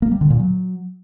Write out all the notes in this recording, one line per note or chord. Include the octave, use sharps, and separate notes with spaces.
A#3
G3
D3
A#2
F#3